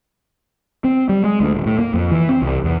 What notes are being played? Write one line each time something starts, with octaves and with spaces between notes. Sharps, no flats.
C4
G3
G#3
D2
D#1
A2
A#3
F2
E3
C4
C2
E2